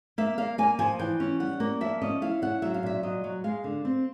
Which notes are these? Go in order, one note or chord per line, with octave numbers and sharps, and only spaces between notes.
A#3 E5
A#3 F5
A#3 G#5
F3 G#5
E3 G5
C#4
G3 F#5
A#3
F3 E5
C#4 D#5
E4 F5
C#4 F#5
F#3 E5
F5
A#2 E5
F#3 D#5
F#3
G#3 F5
D3
C4